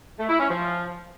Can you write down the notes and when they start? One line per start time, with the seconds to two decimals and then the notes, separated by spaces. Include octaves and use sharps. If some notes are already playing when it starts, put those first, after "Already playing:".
0.19 A3
0.29 E4
0.40 C#4
0.50 F3